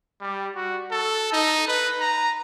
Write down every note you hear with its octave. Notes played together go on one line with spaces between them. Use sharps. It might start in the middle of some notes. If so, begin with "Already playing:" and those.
G3
F#4
A4
D#4
B4
A#5